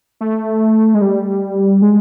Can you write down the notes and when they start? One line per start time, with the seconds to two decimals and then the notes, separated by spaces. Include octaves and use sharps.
0.21 A3
0.94 G#3
1.02 G3
1.82 G#3